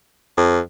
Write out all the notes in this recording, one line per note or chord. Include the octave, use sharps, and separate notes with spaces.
F2